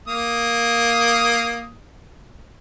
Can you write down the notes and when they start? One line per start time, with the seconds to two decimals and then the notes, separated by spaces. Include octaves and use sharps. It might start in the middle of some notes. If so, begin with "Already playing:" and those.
0.08 A#3 D#6